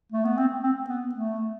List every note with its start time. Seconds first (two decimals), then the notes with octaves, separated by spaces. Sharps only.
0.12 A3
0.25 B3
0.38 C4
0.63 C4
0.89 B3
1.14 A3